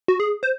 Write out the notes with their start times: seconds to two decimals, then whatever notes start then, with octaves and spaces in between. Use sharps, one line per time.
0.08 F#4
0.20 G#4
0.43 C5